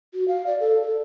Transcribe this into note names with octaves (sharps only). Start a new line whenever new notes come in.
F#4
F5
D5
A4
A4